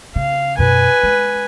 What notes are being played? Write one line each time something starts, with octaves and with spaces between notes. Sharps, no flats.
C#3 F5
F#2 B2 B4 G#5
G#3